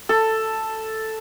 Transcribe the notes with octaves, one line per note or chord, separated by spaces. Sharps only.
A4